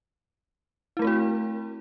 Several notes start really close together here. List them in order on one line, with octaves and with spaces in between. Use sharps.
E4 A3 A#4 C4 F#4